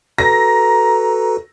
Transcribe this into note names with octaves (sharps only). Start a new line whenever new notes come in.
F#4 A4 B4 A#5 A#6